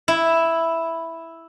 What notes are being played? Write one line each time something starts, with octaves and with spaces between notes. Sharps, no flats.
E4